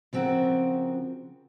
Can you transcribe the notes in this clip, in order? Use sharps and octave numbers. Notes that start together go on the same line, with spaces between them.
C#3 F3 C4 F#4 A#4